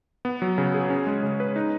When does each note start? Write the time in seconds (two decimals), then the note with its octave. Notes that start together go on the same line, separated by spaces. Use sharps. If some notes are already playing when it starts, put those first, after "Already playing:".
0.25 B3
0.42 F#3
0.58 C#3
0.74 G#4
0.90 C#4
1.07 G#3
1.23 C#3
1.40 B4
1.56 D#4